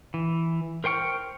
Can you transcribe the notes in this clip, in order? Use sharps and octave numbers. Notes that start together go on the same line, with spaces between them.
E3
A#4 C5 G5 C#6 F6